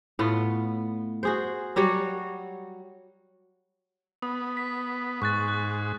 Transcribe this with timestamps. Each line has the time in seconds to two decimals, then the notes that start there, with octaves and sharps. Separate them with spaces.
0.19 A2 B3 F4
1.23 F#4 G#4 C5
1.76 F#3 G3 F#4 C#5
4.22 B3 D#6
4.57 B6
5.22 G#2 C#6 F#6 A6
5.48 F#6